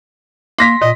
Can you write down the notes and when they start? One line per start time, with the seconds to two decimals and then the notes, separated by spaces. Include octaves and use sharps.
0.58 A#3 C6 A#6 B6
0.81 A#2 D#5